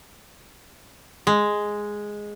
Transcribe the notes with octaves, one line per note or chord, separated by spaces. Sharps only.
G#3